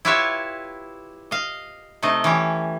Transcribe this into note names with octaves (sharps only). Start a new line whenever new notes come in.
E4 F4 G4 B4 C#5 E5
D#5 F5
C3 A3 D#4 D#5
E3 C#4 G4